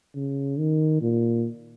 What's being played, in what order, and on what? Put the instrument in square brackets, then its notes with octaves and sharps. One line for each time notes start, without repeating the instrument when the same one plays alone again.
[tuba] C#3
D#3
A#2